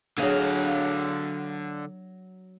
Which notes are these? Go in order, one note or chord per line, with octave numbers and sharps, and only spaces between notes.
D3 F#3 D4 G#4 F5